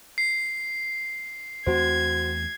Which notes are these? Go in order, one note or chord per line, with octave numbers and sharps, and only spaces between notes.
C7
E2 A3 C4 F#4 C5 G#6